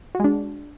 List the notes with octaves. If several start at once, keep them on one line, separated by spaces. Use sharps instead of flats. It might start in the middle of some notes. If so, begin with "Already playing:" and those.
G#3 D4 F#4